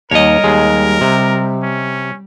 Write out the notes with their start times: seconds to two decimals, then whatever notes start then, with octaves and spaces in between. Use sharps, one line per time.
0.11 D#2 G3 A#4 C#5 D#5
0.44 D#2 G#3
1.01 C3
1.63 C#4